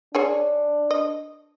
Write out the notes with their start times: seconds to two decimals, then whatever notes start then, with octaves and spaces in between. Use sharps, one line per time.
0.15 D4 G#4 C#5 G#5
0.91 D#5